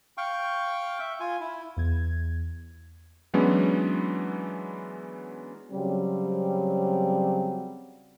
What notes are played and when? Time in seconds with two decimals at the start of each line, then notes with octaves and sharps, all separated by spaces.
0.18 F5 G5 C#6
1.00 E5
1.20 F4 G#5
1.41 E4
1.77 E2 G#6
3.34 E3 F#3 G#3 B3 C#4 D4
5.73 C#3 F#3 G3 C4